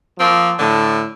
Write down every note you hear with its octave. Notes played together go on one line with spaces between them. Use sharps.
F3 A#3 C4
A2 D3